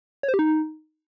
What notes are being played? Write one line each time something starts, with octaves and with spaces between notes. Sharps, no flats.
C#5
C5
G4
D#4